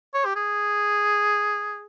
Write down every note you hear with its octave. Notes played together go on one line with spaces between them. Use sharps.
C#5
G4
G#4